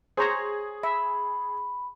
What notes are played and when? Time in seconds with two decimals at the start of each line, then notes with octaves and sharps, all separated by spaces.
0.17 G#4 C5 C#5 A#5
0.83 E5 B5